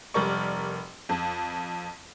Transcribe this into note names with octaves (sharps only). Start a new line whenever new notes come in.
F1 G3 A#4 D5 C#6
F2